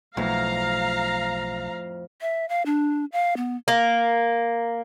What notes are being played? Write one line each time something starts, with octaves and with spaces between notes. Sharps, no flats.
B1 F2 A2 F5 A#5
E5
F5
D4
F5
B3
A#3